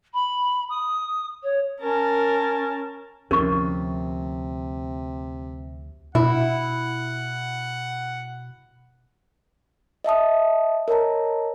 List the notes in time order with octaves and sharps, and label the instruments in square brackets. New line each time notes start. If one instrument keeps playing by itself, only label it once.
[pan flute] B5
D#6
C#5
[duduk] C#4 [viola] A#4 A5
[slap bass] D2 F3 [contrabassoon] C3 [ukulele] C#4 [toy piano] A#4 C#6
[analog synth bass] B2 [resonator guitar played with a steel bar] E4 [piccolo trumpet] F#5
[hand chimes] D#5 E5 A5 D#6
A#4 C#5 D#5 A5 A#5